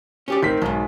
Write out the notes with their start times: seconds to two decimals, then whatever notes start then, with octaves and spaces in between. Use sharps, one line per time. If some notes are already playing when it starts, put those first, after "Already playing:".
0.28 C#4 G4 D5
0.42 A2 D#3 C4 B6
0.62 B1 G#2 D#3